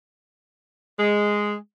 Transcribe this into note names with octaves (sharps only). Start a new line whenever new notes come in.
G#3